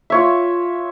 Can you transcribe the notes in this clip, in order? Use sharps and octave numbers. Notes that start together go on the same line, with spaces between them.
F4 C#5 E5